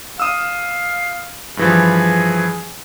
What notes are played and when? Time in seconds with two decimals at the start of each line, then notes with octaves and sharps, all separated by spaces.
0.20 F5 D#6 E6
1.57 G2 E3 F3 G#4